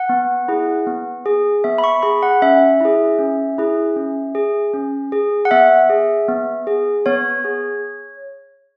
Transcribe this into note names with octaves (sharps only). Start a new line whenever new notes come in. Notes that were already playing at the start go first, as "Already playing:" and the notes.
Already playing: F#5
B3
E4 G#4
B3
G#4
B3 E5
B5
C#6
G#4 B5
F#5
C#4 E5
E4 G#4
C#4
E4 G#4
C#4
G#4
C#4
G#4
F#5
B3 E5
G#4
B3
G#4
B3 C#5
G#4